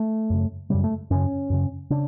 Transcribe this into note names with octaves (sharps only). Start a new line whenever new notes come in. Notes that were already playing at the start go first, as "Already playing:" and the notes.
Already playing: A3
F#2 C#3
F#2 C#3 G3
A3
F#2 C#3 C#4
F#2 C#3
C#3 D4